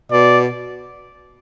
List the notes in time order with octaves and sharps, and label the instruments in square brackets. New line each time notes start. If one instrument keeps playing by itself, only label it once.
[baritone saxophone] B2 [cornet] D5